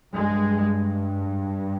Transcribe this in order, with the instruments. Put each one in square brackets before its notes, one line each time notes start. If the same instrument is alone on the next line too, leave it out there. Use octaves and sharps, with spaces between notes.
[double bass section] G2 G#3